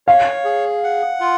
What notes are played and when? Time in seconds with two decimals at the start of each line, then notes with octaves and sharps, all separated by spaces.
0.07 C#5 F5
0.45 G#4
0.84 F#5
1.20 F4